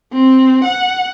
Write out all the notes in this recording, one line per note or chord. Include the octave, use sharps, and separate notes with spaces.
C4
F#5